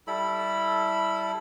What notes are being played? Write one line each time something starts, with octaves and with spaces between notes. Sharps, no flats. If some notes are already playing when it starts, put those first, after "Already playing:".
G3 E4 A4 B5